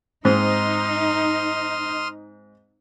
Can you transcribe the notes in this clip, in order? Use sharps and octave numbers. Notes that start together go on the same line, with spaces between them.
G#2 C4 D#4 C6 D#6 F6